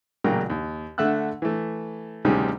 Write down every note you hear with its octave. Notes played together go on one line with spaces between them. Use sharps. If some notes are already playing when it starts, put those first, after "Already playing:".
A1 A#2 C#3 F#3 A#4 G5
D#2
D3 A3 E5 F#5 E6 F#6
E3 A3
D2 C3 D#3 G3 C#4 G#4